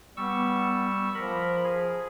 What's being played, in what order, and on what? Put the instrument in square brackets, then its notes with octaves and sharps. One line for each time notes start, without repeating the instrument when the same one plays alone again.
[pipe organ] G3 C#6 E6 [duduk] B3
[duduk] F3 [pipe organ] A#4 B5
[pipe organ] G#4